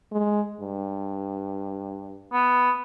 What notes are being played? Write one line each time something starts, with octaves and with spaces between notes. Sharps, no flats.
G#3
G2
B3